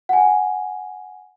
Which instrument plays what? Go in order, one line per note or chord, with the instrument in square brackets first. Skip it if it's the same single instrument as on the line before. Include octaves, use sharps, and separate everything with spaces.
[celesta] F#5 G#5